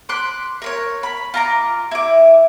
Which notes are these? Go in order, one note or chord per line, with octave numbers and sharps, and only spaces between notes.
B5 C6 D6 F#6
A#4 B4 C#5
B5
F4 A#5 D6
E4 D6